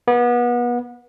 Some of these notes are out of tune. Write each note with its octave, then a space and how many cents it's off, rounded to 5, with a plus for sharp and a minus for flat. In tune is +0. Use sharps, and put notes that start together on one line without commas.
B3 -30